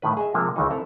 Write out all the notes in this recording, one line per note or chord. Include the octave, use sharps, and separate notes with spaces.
A2 D#3 B4
G#4 D#5 E5
C3 F3 G#3 A#3
C#2 D#3 E3 D#4
C4 E4 A4 A#5